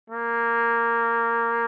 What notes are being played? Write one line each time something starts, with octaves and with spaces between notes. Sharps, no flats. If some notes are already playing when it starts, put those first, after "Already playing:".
A#3